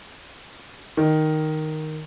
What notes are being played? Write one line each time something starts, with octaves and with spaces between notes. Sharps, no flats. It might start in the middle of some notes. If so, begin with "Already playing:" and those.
D#3